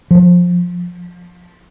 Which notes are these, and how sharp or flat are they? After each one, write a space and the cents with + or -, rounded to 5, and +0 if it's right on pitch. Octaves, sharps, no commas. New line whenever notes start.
F3 +15